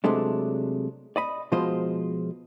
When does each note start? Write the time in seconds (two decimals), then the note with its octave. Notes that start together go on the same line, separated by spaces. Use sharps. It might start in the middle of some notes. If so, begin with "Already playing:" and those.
0.04 C3 F#3 G#3 A3 D4
1.16 D5 D#5 B5
1.52 B2 F3 G#3 F4 C5 D#5